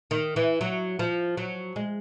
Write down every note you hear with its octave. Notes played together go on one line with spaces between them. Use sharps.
D#3
E3
F#3
F3
F#3
G#3